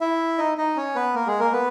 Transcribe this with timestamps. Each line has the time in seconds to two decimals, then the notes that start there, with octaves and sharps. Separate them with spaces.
0.01 E4 E5
0.38 D#4 D#5
0.58 D#4 D#5
0.76 C#4 C#5
0.95 B3 B4
1.15 A#3 A#4
1.27 G#3 G#4
1.40 A#3 A#4
1.53 B3 B4